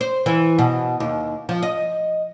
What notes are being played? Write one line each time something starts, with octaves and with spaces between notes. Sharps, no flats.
C5
E3
B2
D#2
F3
D#5